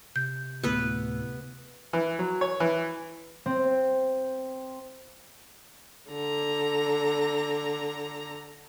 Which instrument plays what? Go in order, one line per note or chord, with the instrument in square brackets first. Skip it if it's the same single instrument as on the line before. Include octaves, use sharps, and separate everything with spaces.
[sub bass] C3 [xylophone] G6
[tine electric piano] D2 A2 E6 [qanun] B3 B4
[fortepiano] E3
F#3
C#5
E3
[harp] C4
[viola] D3 A#5